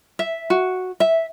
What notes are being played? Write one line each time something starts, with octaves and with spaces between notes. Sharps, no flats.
E5
F#4
E5